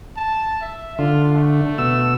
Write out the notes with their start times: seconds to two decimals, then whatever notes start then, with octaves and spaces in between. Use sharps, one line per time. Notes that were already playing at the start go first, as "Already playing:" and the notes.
0.17 A5
0.61 E5
0.99 D3 F4
1.34 A3
1.78 B2 E6